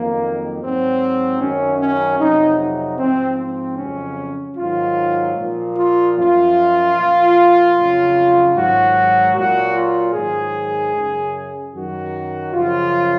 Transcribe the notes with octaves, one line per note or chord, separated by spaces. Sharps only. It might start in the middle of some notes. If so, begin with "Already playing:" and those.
Already playing: F2 D#3 F#3 A#3
G#2 F#3 C4
F#2 D#3 F#3 C#4
C#4
F2 C3 F#3 D#4
D#4
G#2 F3 C4
C4
F2 C#3 F#3 C#4
G#2 D#3 F#3 F4
A#2
F3
F4
F#2 F3 F4
A#2 F3
F2 C#3 F#3
G#2 D#3 F#3 F#4
A#2 F#3 F#4
F4
G#2 D#3 F#3 G#4
F#2 C#3 F#3
F#2 D#3 F#3 F#4
F#2 C#3 F3 F4